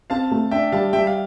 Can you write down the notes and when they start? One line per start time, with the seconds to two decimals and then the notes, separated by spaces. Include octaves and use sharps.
0.10 C4 F5 A5
0.31 A3
0.51 D4 E5 G5
0.72 G3 F5 A5
0.93 G3 E5 G5
1.07 F5